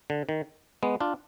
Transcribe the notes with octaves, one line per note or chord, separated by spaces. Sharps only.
D3
D#3
G#3 B3
D4 F4